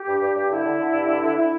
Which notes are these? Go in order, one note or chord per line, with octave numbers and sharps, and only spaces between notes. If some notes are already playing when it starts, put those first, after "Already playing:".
Already playing: G4
G2
G2
G2
D3 E4
D3
D3
G2
D3
D3
D3 E4